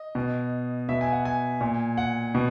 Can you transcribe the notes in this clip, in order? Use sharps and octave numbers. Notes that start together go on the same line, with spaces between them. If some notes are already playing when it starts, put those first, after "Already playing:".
Already playing: D#5
B2
B2 E5
G#5
F#5
G#5
A#2
F#5
B2